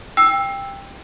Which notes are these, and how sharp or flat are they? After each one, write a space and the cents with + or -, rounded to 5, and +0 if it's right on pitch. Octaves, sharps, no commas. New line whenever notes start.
G5 +15 E6 +0